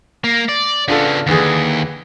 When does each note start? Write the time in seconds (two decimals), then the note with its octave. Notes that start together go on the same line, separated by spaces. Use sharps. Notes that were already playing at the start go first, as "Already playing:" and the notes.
0.24 A#3
0.49 D5
0.88 C#3 B3 D4 F4 A4
1.27 D#2 D3 E3 G#4